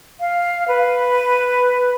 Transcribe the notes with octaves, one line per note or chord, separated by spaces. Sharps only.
F5
B4